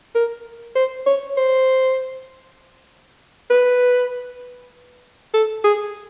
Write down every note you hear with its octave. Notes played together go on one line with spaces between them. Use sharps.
A#4
C5
C#5
C5
B4
A4
G#4